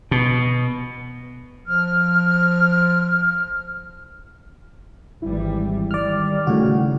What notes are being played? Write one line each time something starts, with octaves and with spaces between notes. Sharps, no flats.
B2
F3 F6
G#1 E3 G3 E4
D#3 G3 D5 F6
A2 C#3 F#4